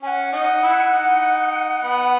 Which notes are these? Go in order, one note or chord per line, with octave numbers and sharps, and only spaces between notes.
C#4 F#5 G#5
D#4
E4
D#4
B3